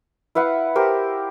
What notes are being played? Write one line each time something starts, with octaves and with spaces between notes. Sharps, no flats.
E4 B4 F5 F#5
G4 A#4 C5